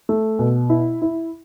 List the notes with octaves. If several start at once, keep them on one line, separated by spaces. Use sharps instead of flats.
A3
B2
E4
E4